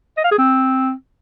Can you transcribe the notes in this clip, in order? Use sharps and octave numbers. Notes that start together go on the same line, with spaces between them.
D#5
F5
G#4
C4